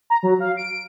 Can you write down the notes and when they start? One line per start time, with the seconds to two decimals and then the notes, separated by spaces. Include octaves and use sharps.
0.10 A#5
0.23 F#3
0.40 F5
0.57 D7